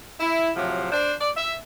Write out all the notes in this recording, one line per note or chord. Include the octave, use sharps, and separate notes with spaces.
E4
A2 C3 F3 F#3
D4 C5
D5
E5